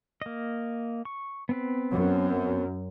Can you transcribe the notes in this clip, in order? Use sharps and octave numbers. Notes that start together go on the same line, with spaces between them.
A#3 D#5
C#6
B3 C4 B4
F#2